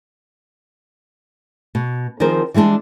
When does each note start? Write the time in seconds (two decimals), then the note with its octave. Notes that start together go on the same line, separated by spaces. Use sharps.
1.75 B2
2.20 D#3 F3 C4 G#4 A#4 C5
2.54 E3 G3 G#3 A#3 D4